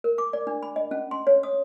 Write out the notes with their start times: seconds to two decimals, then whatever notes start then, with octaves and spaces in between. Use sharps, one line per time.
0.04 A#4
0.18 D6
0.33 D5
0.47 D4
0.63 B5
0.76 D#5
0.91 C#4
1.11 C6
1.27 C#5
1.43 D#6